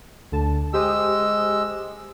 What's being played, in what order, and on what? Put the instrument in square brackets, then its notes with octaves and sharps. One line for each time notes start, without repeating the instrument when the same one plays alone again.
[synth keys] D2 D3 A5
[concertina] G#3 E6 [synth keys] G4 C5 D#6